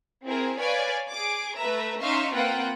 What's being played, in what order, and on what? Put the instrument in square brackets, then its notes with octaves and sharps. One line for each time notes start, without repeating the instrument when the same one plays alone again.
[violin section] C4 E4 G#4 A#4
B4 C#5 D5 F5 G#5
G#4 D6
A3 B4 E5 A#5
C#4 D#4 E5 F5 C6 C#6
A#3 C4 F4 B4 F#5 G5